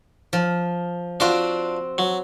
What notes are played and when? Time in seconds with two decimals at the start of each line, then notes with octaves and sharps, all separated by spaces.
0.33 F3
1.20 C4 D4 F4 F#4
1.98 F#3